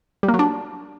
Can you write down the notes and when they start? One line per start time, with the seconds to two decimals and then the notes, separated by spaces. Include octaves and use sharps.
0.23 G3
0.28 A#3
0.34 F#3
0.39 D4